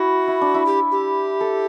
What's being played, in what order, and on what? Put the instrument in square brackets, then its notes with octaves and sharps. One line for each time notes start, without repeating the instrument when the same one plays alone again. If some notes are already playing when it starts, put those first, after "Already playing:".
Already playing: [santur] E4 [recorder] F#4
[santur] E4
D4
E4
[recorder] G4
G4
[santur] A4